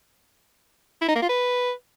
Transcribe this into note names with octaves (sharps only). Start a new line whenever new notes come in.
E4
D#4
A#3
F4
B4